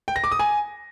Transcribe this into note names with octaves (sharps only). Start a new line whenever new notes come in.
G5
A#6
D6
D#6
G#5